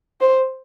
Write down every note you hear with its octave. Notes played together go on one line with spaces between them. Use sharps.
C5